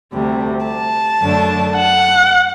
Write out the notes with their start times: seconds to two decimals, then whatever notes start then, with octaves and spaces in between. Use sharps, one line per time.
0.13 D2 C3 G3
0.67 A5
1.22 F#2 D3 A3 D4
1.77 F#5